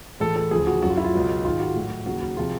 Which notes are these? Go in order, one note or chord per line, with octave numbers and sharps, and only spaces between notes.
A2 E3 G#3 A4
A4
D2 C#3 F3 G#4
F#4
F#2 C#3 F#3 F#4
F4
E4
F4
C#2 B2 F#3
G#2 D#3 G#3 F4
F#4
A2 F#3
D#2 C#3 F#3 F#4
F#4
C3 F3 G#3 F4